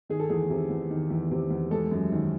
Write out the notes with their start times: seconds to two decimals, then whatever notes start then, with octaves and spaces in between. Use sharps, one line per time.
0.09 D#3 G#4
0.20 A4
0.30 E2 G#4
0.50 C3
0.70 E2
0.90 D#3
1.10 E2
1.31 C3
1.51 E2
1.71 G#3 A4
1.91 F#2
2.12 D#3